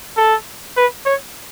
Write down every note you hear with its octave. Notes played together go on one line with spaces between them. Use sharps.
A4
B4
C#5